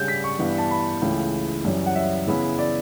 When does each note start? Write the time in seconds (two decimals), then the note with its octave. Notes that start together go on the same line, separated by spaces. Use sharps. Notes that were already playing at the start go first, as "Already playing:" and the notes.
Already playing: C#3 G3 D4 G6
0.08 B6
0.24 C#6
0.39 G2 E3 G3 B3 D4
0.58 A5
0.71 B5
1.02 C#2 C#3 E3 A3
1.65 F#2 E3 G3 C#4
1.86 F#5
1.95 E5
2.27 C#3 E3 B3 E4
2.58 D5